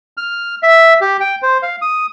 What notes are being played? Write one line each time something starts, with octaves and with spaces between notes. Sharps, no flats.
F6
E5
G4
G5
C5
F5
D#6